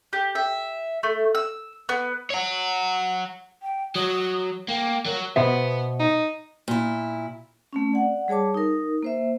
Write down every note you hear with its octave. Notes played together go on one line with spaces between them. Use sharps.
G4
E5
A3
E6
B3
C#5 F#5
G5
F#3 D#6
A#3 G5
F#3 A#4
B2 B3 C5 E5
D#4
A#2 E4
A3 C4 C#4
D5 F#5
G3 G#4 C#5 A5 D6
D#4 A#4
A#3 C5 E5